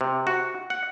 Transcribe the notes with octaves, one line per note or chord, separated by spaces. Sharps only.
C3
F#4
F#5